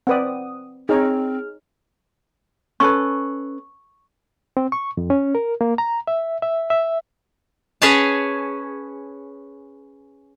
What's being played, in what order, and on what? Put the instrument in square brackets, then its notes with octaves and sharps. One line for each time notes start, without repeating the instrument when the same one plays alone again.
[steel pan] C4 B4 D5 [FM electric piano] F#5 D#6
[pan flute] C4 [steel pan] D#4 C#5 [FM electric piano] G#4 F6
[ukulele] C#4 A4 B4 [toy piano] C#6
[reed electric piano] C4
C#6
F2
C#4
A#4
A#3
A#5
E5
E5
E5
[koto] C#4 G#4 B4 C#5 G#5 A5